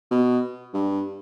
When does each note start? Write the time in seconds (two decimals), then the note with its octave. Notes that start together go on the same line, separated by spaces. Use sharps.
0.11 B2
0.74 G2